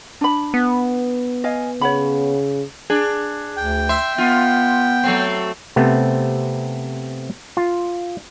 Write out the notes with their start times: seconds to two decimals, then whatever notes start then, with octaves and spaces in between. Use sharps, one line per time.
0.21 D4 B5
0.54 B3
1.44 D#5 F5 G#5
1.81 C#3 C#5 F#5 B5
2.90 D4 G#4
3.57 D2 G5
3.89 E5 C6
4.18 B3 F4
5.04 F#3 A3 C4 C7
5.76 C3 A3 B3 C4
7.57 F4